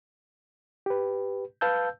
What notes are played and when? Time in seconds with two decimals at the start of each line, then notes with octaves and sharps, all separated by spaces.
0.86 G4 B4
1.61 B4 F5 A5 E6 G6